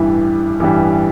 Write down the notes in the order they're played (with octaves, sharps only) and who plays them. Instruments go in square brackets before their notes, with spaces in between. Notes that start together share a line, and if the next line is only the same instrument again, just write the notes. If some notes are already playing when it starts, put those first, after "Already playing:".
Already playing: [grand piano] A1 G2 E3 G3 [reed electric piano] E4
[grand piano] A1 G2 E3 G3